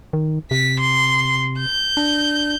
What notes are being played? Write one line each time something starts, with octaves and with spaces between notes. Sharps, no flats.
D#3
C3 B6
C6
G6
D4